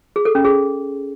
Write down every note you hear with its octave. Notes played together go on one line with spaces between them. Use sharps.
G#4
A4
C#4
G#4